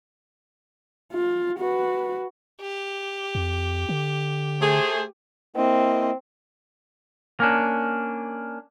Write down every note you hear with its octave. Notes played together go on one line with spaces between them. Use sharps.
F4
F#4 B4
G4
F2
D3
A3 G#4 C5
A#3 C4 E4 D#5
A#3 C#4 D4